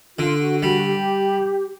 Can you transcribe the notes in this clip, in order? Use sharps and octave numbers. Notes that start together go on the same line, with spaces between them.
D3 F4
F#4
G3 F#4
G4